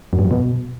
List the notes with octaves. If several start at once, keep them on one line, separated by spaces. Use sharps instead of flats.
F#2
G2
F#2
B2